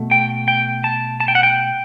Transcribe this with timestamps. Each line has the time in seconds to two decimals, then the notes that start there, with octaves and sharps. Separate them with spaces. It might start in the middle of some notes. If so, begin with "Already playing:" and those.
Already playing: B2 A3
0.11 G5
0.48 G5
0.84 A5
1.20 A5
1.28 G5
1.35 F#5
1.43 G5